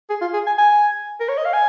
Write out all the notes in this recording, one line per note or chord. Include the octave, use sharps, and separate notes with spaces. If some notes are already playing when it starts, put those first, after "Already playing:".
G#4
F4
G#4
G#5
G#5
A#4
C#5
D#5
F5
G#5